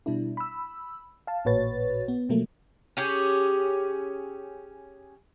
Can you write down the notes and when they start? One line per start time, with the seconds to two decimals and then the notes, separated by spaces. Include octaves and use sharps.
0.06 B2 G3 D4 E4
0.37 B5 E6
1.27 F5 A5
1.45 A1 A#2 F#4 B4 C#5 A6
2.08 B3
2.29 B2 F3 F#3 A3 A#3
2.97 C#4 G4 G#4